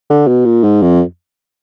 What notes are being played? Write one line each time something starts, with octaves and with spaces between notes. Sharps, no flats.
D3
B2
A#2
G#2
F2